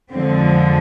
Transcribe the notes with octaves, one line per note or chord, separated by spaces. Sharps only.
F2 D3 F3 G#3 C4